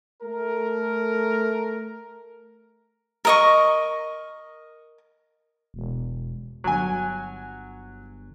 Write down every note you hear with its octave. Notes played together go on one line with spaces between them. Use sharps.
A3 A#4
A#4 D#5 C#6
E1
G1 F#3 G#5